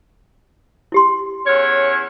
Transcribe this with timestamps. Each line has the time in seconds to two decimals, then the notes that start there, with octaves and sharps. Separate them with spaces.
0.92 E4 G4 C6
1.46 E2 C#4 C#5